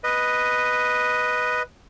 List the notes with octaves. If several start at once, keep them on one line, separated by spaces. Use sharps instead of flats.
B4 D#5